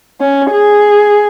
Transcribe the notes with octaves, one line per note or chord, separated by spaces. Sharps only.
C#4
G#4